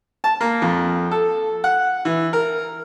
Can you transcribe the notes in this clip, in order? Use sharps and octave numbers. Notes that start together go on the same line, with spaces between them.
A5
A#3
F2
A4
F#5
E3
A#4